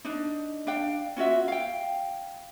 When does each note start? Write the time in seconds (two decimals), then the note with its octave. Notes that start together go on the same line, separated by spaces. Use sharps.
0.05 D4 D#4
0.67 D4 F5 G5
1.17 C#4 F4 F#4 E5
1.48 F5 G5